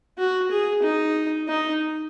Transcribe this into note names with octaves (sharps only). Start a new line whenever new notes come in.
F#4
G#4
D#4
D#4